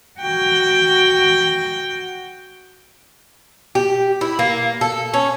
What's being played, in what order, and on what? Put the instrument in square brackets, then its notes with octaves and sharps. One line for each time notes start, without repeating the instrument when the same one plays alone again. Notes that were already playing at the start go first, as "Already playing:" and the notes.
[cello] F#4 G5
[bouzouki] G4
E4
A#3
A4
C#4